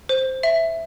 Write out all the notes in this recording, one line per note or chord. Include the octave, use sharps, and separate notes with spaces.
C5
E5